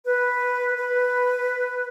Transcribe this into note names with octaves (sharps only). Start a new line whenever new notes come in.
B4
B4